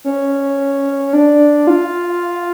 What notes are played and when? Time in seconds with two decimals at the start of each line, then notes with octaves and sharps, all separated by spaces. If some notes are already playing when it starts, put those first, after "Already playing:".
0.04 C#4
1.13 D4
1.67 F4